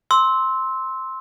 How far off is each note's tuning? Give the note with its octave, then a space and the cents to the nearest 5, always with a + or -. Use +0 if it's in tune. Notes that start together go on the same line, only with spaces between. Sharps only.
C6 +5 E6 -20